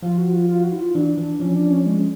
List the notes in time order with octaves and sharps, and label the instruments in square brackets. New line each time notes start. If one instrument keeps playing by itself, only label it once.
[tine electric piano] F3 [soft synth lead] F4
[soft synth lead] F#4
F4
F4
F#4
E4
F4
[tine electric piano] E3 [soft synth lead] D4
[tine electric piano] E3
[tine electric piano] F3 [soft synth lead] C#4
[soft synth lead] D4
C#4
G#3